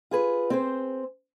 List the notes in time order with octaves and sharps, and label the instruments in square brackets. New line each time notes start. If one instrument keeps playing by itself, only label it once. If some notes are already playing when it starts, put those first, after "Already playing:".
[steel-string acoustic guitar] F4 G#4 B4
C4 G#4 C5